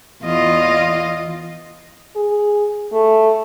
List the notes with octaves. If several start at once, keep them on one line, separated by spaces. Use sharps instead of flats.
E2 F4 D#5
G#4
A3